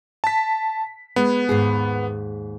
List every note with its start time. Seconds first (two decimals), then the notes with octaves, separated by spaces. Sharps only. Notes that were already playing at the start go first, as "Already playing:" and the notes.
0.24 A5 B6
1.16 G#3 B3
1.49 D#2 G#2 G#4